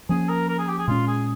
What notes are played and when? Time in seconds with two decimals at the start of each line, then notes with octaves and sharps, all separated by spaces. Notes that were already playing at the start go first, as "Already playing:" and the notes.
0.09 F3 A#3 C#4 G#4
0.29 A#4
0.49 A#4
0.59 G#4
0.68 G4
0.78 G#4
0.88 A#2 G#3 C#4 F4
1.08 G#4